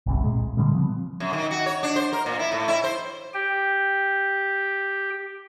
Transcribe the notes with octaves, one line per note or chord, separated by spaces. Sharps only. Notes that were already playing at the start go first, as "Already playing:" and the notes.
G1 C2 C3
A#2 G#3
A#2 D3 G3 G#3
C#3 F3 B3 C4
F#2
D#3
F#4
C#5
D4
C5
A#4
A#2
E4
A2
E4
C5
G4 G5